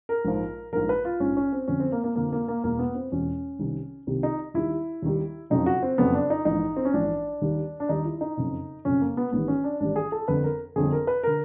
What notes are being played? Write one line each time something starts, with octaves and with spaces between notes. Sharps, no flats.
A#4
A#1 G#2 F3
A#1 G#2 F3 A#4
B4
F4
A#1 G#2 F3 C#4
C#4
C4
F2 D3 F3 C#4
C4
A#3
A#3
F2 D3 F3 A#3
A#3
A#3
E1 E2 B2 A#3
B3
C4
E1 E2 B2 C#4
C2 C3 D#3 G3
C2 C3 D#3 G3
D#4
D#2 D#3 G3 E4
D#2 D#3 G3
F#1 F2 C#3 F#3 D#4
F#4
C4
F#1 F2 C#3 F#3 B3
D4
D#4
A#1 G#2 E3 D#4
C4
C#4
A#1 G#2 E3 D4
D#2 D#3 G3
D4
D#2 D#3 G3 D#4
E4
D#4
F#1 F2 C#3
F#1 F2 C#3 C#4
A#3
B3
A1 G#2 D#3 G3 B3
C#4
D4
A1 G#2 D#3 G3 D4
G#4
A4
G1 F2 D3 B4
A#4
G1 F2 D3 G#4
A#4
B4
D3 A#4